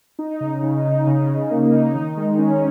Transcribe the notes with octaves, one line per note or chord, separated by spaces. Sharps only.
D#4
C#3
C#3
D#4
C#3
C#3
A#3
D#4
D#3
G#3
C#4